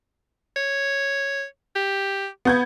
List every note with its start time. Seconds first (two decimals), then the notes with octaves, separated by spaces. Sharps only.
0.56 C#5
1.75 G4
2.45 B3 G6 G#6